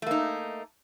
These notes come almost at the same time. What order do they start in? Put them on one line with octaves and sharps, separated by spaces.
A3 A#3 D#4